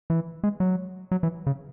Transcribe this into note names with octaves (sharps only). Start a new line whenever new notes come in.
E3
G#3
F#3
F#3
E3
C#3